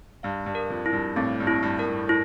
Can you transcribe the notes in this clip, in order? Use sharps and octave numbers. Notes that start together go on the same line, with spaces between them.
G2 F5
G2
A#4
F2
E4
G2
A2 C4
G2
E4
G2
A#4
G2
E4